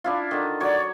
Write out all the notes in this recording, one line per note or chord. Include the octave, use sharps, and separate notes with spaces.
D4 E4 F4
D3 D#3
F#3 C#5 D5 D6